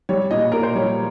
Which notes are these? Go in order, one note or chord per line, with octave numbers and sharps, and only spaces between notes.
G3 C#5
A#2 D#5
A#2 A#4
C5
G3 C#5